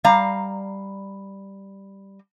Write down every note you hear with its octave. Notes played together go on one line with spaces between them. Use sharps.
G3 F5 A#5